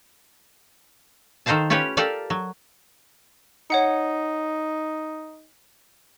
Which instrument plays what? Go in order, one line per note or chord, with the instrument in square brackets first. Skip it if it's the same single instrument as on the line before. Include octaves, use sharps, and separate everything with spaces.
[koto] D#3 A4 A#4 C5 F5 A5
C#4 F4 G4 B4 C#5
G4 A4 A#4 D5 F5
F#3
[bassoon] D#4 [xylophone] C#5 F#5 C#7